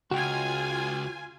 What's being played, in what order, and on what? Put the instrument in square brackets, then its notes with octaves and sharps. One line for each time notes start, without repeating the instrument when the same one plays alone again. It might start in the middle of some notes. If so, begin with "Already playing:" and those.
[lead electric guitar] C#2 [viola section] F4 G#5 [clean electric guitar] F#4 G5